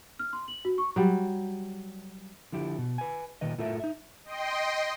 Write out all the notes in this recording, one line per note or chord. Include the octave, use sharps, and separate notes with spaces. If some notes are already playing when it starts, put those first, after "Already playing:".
F6
C6
F#7
F#4
C#6
F#3 G3
D3 F3 E4 G4
B2
B4 G#5
A#2 D#3 B4 D#5
A2 A3 F4 A4 A#4 E5
D#4 E5
D#5 G5 C6